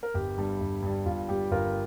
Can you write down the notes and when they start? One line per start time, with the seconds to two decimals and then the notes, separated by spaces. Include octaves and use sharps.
0.03 A#4
0.14 G1 G4
0.38 G2 G3
0.60 G1
0.82 G2 G3
1.06 G1 F4
1.29 G2 G3 G4
1.51 G1 F4 A#4